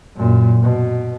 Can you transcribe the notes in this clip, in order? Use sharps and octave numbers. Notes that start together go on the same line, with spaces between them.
F#2 A#2
B2